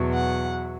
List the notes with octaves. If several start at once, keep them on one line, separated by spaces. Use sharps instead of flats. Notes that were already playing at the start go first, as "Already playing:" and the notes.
Already playing: E2 B2 F#3
F#5